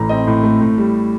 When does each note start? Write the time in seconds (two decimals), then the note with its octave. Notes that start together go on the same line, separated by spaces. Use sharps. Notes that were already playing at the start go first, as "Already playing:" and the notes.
Already playing: A1 A2 A3 A#5
0.09 C4 D#5
0.27 A2
0.44 A3
0.61 A2
0.78 G3